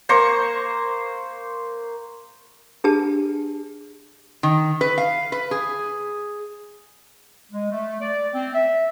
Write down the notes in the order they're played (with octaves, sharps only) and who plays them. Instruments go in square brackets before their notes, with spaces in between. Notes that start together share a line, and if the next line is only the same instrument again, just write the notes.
[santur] A#3 C5 A#5 C#6
[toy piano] D4 G4 G#4 B4 A5
[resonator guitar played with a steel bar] D#3
B4
F5
B4
G#4
[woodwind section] G#3
A3
D5
C4
E5